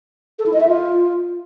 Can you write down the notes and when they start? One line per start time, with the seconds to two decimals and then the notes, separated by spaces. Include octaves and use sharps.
0.39 A4
0.46 E4
0.53 D#5
0.60 E5
0.68 F4